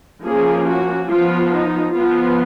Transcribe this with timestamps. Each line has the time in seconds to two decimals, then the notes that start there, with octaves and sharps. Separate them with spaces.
0.24 F3 A#3 C#4 G#4
0.67 F#4
1.10 F3 B3 F4
1.53 D#4
1.95 F3 B3 F4